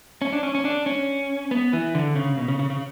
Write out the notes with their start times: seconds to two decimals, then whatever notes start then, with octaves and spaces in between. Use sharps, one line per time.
0.22 C#4
0.33 D4
0.43 C#4
0.55 C#4
0.65 D4
0.86 C#4
1.51 B3
1.73 E3
1.95 D3
2.16 C#3
2.37 B2
2.48 C#3
2.59 C#3
2.70 C#3